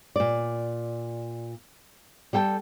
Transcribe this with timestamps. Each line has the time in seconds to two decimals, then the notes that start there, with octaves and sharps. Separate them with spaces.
0.16 A#2 D5
2.33 G3 A4 G5 A5